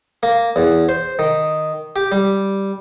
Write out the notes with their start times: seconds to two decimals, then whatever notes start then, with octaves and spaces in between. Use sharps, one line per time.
0.23 A#3
0.56 E2
0.89 C5
1.19 D#3
1.96 G4
2.12 G3